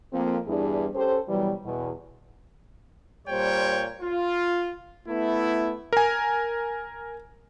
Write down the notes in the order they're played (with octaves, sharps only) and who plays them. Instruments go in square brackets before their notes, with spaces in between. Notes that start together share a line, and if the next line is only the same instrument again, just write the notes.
[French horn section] F2 A#3 C4
E2 G2 G3 D4 E4 G#4
C#4 G4 A4 C5
B2 E3 F#3 G3
E2 B2
[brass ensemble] A#2 G3 C5 C#5 G5
F4
A3 B3 E4
[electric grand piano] A#4 G#5